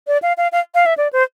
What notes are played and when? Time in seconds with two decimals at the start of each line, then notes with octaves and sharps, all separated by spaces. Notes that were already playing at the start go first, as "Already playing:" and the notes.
0.07 D5
0.22 F5
0.37 F5
0.52 F5
0.75 F5
0.86 E5
0.97 D5
1.13 C5